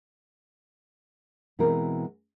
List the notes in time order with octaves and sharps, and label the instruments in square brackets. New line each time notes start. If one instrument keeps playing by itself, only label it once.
[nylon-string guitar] B2 E3 G#3 C4 A#4